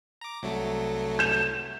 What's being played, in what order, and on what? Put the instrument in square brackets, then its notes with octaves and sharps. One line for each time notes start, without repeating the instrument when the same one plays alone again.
[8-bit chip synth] A#5 D6
C2 F#3 A3
[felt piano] G6 E7